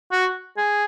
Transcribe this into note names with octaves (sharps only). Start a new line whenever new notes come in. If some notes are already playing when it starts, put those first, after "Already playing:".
F#4
G#4